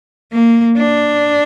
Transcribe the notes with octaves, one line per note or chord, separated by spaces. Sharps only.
A#3
D4